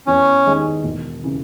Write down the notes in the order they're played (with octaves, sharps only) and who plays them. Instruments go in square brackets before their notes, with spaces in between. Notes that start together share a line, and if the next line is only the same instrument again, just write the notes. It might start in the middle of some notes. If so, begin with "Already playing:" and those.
[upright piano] E2 [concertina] C#4
[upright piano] D#3 G#3
E1
C#3 E3